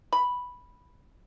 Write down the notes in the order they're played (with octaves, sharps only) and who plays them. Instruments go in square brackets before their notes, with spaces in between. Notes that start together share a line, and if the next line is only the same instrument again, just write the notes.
[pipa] B5